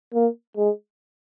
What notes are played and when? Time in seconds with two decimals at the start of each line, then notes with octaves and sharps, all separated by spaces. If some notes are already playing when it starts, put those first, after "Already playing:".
0.14 A#3
0.57 G#3